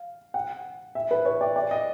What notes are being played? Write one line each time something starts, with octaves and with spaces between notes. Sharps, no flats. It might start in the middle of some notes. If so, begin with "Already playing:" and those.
Already playing: F5
F#5
E5
B4
C#5
D5
D5
D#5